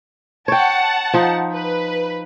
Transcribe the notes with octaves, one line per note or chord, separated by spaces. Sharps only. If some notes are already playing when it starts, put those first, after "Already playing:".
C#5 F#5 G5 A5
F3 D#4
B4